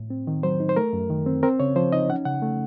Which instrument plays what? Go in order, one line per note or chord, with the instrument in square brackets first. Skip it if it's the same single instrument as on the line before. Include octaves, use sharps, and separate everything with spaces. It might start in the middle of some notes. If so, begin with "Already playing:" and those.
Already playing: [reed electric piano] A2
C4
D#3
F#3 C5
D#4
C5
A3 A#4
F#2
D#3
C4
C4 A#4
C#3 C#5
F3 C5
D#4 D#5
C#4 F#5
C#3 F#5
A3